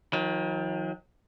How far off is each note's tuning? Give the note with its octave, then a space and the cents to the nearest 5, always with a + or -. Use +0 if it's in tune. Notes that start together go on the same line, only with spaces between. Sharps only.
D#3 +35 F#3 -35